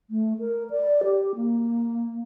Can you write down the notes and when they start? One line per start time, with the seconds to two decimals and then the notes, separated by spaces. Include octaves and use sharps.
0.10 A3
0.39 A#4
0.70 D5
1.04 G4
1.36 A#3